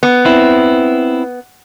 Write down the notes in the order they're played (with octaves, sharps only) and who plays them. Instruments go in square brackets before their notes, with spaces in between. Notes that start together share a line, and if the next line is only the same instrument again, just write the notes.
[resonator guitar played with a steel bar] B3
[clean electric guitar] C4 E4